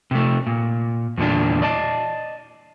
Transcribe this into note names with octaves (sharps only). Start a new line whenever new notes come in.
C3 A3
A#2
E2 A#2 D3 D4
D5 D#5 A5